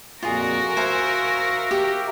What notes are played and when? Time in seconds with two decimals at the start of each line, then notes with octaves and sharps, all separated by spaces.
0.23 F2 A#2 F4 F#4 G#4 A#4
0.77 C5 E5 F5 G#5 A#5
1.71 G4